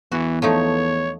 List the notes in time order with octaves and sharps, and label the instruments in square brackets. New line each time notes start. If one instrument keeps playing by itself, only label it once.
[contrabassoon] E2 [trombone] E3 [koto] F#4
[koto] F3 A3 D#4 [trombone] C#5